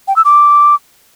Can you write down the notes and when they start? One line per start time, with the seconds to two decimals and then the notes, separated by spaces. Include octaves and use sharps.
0.08 G5
0.16 E6
0.25 D6